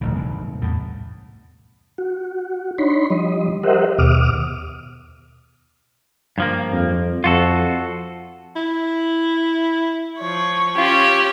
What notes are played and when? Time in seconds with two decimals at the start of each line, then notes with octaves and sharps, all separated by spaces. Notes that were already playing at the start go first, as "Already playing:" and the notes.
0.01 D#1 A1 C#3
0.15 C2 G#2
0.61 E2 A2
1.98 F#4
2.78 D4 D#4 C#5 B5 C6
3.10 F3 G3 D#5
3.63 G4 A#4 C5 D#5 E5 F#5
3.99 D#2 B2 D6 D#6 F6
6.38 G2 F3 A#3
6.72 F2
7.24 F2 F4 F#4 A4
8.56 E4
10.18 F3 C#5
10.78 C#4 F4 G4